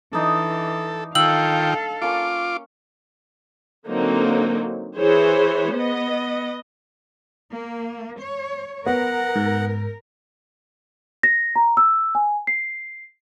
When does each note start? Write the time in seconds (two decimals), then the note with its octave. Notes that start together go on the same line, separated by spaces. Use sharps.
0.13 E3 D4 D#4 A4 D#5
1.15 D#3 F4 A4 F5 G5 E6 F#7
2.02 A#3 C#4 F4 C#5 D6
3.88 D3 F#3 A#3 C4 D#4
4.96 E3 G#4 C5 C#5
5.72 B3 D#5
7.53 A#3
8.20 C#5
8.86 B3 A#4 F#5
9.36 G#2
11.23 A#6
11.56 A#5
11.77 E6
12.15 G#5
12.47 C7